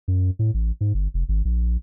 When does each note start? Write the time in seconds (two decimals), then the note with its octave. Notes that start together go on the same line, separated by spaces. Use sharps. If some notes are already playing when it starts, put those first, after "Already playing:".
0.08 F#2
0.39 A2
0.54 A1
0.81 G#2
0.94 G1
1.14 F1
1.29 G#1
1.45 A#1